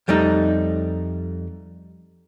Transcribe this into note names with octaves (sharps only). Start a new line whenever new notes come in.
F2 G3 A3 D#4